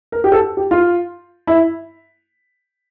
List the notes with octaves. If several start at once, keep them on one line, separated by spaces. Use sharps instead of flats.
A#4
G4
A4
G4
F4
E4